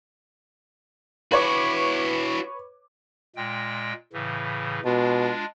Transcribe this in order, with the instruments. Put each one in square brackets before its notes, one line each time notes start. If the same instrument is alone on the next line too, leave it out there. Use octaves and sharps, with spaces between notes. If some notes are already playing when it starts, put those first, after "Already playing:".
[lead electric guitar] E4 F#4 [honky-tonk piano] B4 C#5 D6
[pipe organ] A#2 G#3 G5
A2 C#3 E3
[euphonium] B2 [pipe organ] G#3 D4 F4